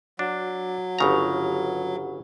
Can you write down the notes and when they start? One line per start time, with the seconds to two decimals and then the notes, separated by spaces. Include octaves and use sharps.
0.19 F#3 D4
0.99 G1 C#3 A#5